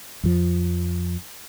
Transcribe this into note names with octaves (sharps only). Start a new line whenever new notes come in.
F2 F3